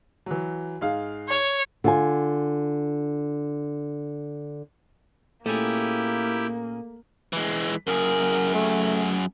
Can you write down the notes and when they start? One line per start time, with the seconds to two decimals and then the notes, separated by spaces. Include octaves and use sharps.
0.26 E3 F#3
0.81 G#2 G#4 F5
1.29 C#5
1.84 D3 F4 G#5
5.46 A#2 A3 A#3 C#4 E4 G4 G#4
7.33 E3 G#3
7.87 F#2 G#4 A#4
8.54 A3